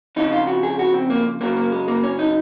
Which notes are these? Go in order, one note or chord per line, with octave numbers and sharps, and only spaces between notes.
F2 C#3 F3 D#4
F4
F#4
G#4
F#4
C4
A#3
F#2 C#3 F#3 A#3
A#3
G#3
A#3
C#4
D#4